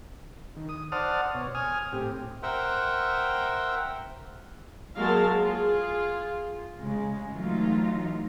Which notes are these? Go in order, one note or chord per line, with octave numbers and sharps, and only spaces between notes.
D#3
D#6
C5 D5 F#5 A5 D#6 F6
B2 C#5
G#5 D#6 F6
A2 C4 G4
A#4 C5 E5 F#5 G5
F#3 G#3 A#3 A#4 F5 A5
F4 G#4
C#3 G#3
E3 F#3 A3 D#4 F4